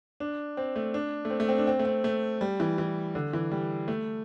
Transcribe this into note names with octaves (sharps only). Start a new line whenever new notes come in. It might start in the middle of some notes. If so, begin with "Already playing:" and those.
D4
C4
A3
D4
A3
C4
A3
C4
D4
C4
A3
C4
A3
G3
E3
E3
D3
E3
G3
A3